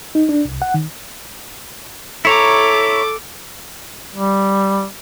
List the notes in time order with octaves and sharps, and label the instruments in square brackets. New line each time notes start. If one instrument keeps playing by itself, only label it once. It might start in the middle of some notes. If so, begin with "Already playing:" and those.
[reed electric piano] D#4
D4
C2
F#5
D#3
[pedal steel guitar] E4 C#5 A#5 [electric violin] A4 D6
[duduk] G3